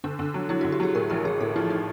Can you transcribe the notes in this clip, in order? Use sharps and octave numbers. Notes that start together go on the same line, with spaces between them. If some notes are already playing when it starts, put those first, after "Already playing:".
D3 D4
D3
F#3
F#3 E4
F#4
D3
G4
F#3 G#4
A2 A#4
A1 A#4
A1 G#4
A2 A4
F3 E4
D#4